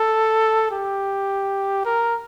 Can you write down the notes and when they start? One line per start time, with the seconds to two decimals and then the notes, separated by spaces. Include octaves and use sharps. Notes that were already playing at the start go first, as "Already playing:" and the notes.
Already playing: A4
0.71 G4
1.85 A#4